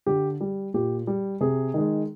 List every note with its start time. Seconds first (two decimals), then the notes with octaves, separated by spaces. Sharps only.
0.06 D3 G4
0.41 G3
0.74 A#2 G4
1.07 G3
1.41 C3 G#4
1.74 D#3 G#3